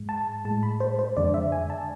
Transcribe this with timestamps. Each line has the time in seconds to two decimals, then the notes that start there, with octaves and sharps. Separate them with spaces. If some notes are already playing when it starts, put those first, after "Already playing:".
Already playing: G#2 G#3
0.09 A5
0.45 A2 G#3 A5
0.63 B5
0.80 C5
0.99 C5
1.17 F2 D3 G#3 D5
1.34 E5
1.52 G#5
1.70 A5